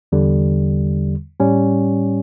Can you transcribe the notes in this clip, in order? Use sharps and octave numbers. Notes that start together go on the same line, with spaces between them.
E2 D3 G3
A2 G3 C#4